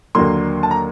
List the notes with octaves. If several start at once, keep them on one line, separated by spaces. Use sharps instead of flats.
D#2 D3 F#3 A#3 C6
A5
A#5